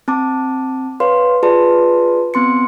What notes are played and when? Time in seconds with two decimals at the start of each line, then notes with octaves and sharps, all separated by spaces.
0.08 C4 A5 D6
1.00 B4 C#5 F5 C6
1.43 F4 G#4 B4 D5 A5 C6
2.34 B3 C4 C6 C#7